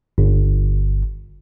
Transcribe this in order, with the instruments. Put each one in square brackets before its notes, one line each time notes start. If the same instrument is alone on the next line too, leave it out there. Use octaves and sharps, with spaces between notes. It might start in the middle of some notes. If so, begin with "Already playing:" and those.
[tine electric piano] G1